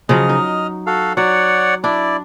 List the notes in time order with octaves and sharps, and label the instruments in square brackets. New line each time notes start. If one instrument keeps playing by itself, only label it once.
[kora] C#3 F3 F#3 [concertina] D#5 F6
[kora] D#4
[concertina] F#4 A4 F5
[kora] F#3 [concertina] C#5 D5 F#5
[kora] D4 [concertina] E4 D5